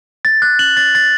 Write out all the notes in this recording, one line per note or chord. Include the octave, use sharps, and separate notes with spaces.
A6
F#6
F#7
A6
A6